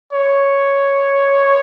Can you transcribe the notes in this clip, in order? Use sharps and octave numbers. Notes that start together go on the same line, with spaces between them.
C#5